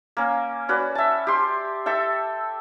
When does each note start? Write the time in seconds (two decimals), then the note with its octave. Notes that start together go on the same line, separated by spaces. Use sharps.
0.17 A#3 C#4
0.69 C#4 F#4 B4 D5
0.95 E5 A5
1.27 G4 C6
1.86 A4 E5 G5